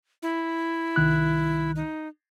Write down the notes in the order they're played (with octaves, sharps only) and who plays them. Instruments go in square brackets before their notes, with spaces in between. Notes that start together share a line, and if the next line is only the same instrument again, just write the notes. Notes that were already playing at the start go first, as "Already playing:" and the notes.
[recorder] E4
[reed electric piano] C2 D#3 F#6
[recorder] D#4